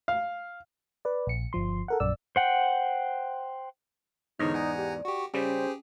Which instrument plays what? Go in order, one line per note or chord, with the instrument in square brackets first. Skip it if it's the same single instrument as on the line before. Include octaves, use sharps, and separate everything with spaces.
[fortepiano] F5
[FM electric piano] B4 D5
A#1 C#7
G1 F3 C6
A4 A#4 F#5
A#1 F#2 D5 E6
[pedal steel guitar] C5 F#5 G5
[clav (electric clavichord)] E2 G#2 D#5 [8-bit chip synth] D3 C#5 F6 [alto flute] D#4
[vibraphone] D5 [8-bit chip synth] F#5 G#5 A#5
[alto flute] G4
[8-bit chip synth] F#4 G4 [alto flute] C#6
[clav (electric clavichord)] C#3 G3 [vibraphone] C#4 [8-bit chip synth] G4 G#4 [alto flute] C5